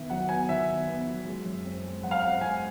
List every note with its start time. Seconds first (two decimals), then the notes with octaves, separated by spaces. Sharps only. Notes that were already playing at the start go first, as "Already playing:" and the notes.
Already playing: D#3 B3 E5
0.10 F#3 F#5
0.29 B3 G#5
0.49 D#3 E5
0.68 B3
0.87 B3
1.07 F#3
1.25 G#3
1.45 F#2
1.65 C4
1.84 G#3
2.03 F#2 F#5
2.11 F5
2.20 C4 F#5
2.41 G#3 G#5